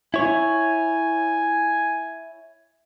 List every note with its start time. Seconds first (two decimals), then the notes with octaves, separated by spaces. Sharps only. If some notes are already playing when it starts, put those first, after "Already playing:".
0.14 E4 C#5 G#5